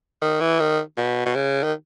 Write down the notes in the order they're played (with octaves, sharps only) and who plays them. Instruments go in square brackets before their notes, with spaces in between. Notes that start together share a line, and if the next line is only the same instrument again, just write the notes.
[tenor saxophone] D#3
E3
D#3
B2
B2
C#3
D#3